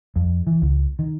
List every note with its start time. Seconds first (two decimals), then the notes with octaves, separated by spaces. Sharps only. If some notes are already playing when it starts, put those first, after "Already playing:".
0.16 F2
0.47 E3
0.62 C#2
0.99 D#3